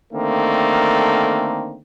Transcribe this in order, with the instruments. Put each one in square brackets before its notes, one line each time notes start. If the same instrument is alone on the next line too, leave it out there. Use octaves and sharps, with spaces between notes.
[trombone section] D3 D#3 A3 A#3 C4